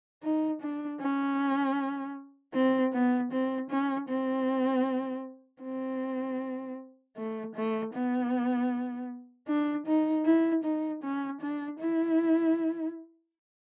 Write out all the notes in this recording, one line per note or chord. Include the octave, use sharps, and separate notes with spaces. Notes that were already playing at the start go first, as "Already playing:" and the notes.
D#4
D4
C#4
C4
B3
C4
C#4
C4
C4
A3
A3
B3
D4
D#4
E4
D#4
C#4
D4
E4